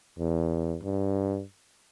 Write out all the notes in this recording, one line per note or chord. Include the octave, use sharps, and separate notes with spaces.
E2
G2